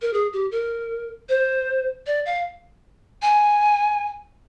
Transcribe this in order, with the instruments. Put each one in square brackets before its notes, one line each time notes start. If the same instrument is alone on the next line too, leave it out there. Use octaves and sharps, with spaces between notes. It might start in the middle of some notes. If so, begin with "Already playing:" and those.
[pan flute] A#4
G#4
G4
A#4
C5
D5
F5
G#5